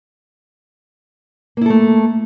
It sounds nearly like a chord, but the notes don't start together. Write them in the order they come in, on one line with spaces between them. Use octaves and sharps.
A#3 E4 A4 A3